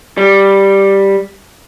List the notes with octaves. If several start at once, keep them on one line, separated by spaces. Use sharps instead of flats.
G3